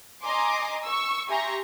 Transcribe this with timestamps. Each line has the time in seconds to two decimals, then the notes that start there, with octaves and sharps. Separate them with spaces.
0.23 D#5 G#5 A#5 C6 D6
0.84 C#6 E6
1.28 G4 E5 G#5 A#5 C6 C#6